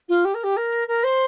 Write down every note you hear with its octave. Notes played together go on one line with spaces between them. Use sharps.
F4
G4
A#4
G4
A#4
A#4
C5